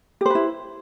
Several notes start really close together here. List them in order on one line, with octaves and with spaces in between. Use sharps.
G4 C5 B4 E4